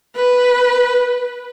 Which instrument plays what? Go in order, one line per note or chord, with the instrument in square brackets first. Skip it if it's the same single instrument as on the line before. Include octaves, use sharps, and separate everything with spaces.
[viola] B4